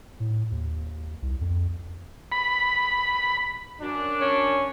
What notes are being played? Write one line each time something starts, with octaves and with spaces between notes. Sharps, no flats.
A2
D#2
C2
F2
B5
F#2 D4
C#4